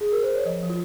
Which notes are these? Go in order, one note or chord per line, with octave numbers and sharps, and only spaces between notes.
G#4
A#4
C5
C#5
F3 D#5
F3
F4